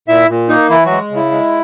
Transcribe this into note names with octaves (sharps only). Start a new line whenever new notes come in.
A#2 E4 E5
A#2
A#3 D#4
E3 E4
F#3 F#4
G#3
C#3
E4
G#3